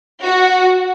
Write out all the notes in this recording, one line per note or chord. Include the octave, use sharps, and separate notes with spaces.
F#4